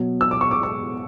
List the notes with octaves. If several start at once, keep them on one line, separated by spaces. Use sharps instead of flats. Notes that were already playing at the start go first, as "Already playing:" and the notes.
Already playing: B2 F#3
E6
D6
C#6
D6
C#6